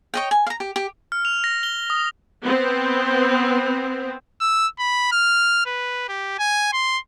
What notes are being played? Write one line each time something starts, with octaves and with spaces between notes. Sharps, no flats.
C#5 D#5 G5
G#5
F5 A#5
G4
G4
F6
F7
A#6
G7
D#6
B3 C4
E6
B5
F6
B4
G4
G#5
C6